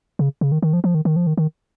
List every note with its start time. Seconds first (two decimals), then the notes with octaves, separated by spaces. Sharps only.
0.19 C#3
0.41 C#3
0.52 D#3
0.62 D#3
0.73 F3
0.84 F3
0.95 D#3
1.05 D#3
1.16 F3
1.27 D#3
1.37 D#3